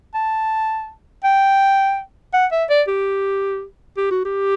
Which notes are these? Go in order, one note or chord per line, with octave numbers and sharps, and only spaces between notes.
A5
G5
F#5
E5
D5
G4
G4
F#4
G4